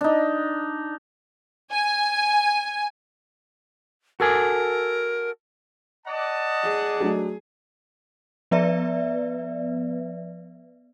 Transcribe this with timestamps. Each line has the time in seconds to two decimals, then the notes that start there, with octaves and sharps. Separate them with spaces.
0.01 D4 D#4
1.72 G#5
4.20 F#4 A4 A#4 G#5
6.07 D5 D#5 F#5 A5
6.63 G#4
7.00 F#3 A3 D4
8.51 F3 B3 B4 D5 E5